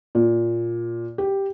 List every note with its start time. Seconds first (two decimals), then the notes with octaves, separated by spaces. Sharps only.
0.15 A#2
1.18 G4